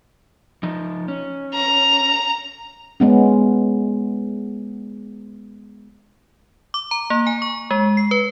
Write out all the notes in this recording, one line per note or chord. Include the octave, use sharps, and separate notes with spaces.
F3 D#4
C#4
A#5
G#3 B3 C#4
D6
A#5
A#3
G#5
C#6
G#3
C7
B4